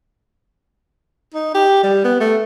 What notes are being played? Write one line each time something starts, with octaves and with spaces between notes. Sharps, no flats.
D#4
G4
G3
B3
A3